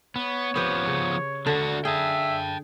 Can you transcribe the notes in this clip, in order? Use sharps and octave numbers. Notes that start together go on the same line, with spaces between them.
B3 C#5
F3 B3 C4 G4 B4
C#3
D3 D4 F#4
G#4 E5 G5 A5